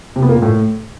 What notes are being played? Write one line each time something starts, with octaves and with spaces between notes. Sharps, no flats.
C3
B3
A#3
A#2
A2